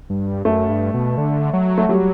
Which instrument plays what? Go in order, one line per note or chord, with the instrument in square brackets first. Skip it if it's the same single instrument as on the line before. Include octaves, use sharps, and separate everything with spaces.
[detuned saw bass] G2
[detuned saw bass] F#2 [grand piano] A3
[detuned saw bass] G2
B2
D3
F#3
[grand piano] A3
[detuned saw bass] F#3 [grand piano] G3